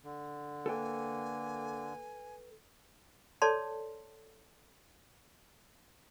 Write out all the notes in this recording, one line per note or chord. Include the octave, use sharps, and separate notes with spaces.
D3
A#3 A4 B4 G5 G#5
A4 C#5 D5 A5 C6